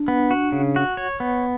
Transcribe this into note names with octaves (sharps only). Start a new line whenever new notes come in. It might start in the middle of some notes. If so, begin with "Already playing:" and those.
Already playing: D4
B3
F#4
C#3
F#4
C#5
B3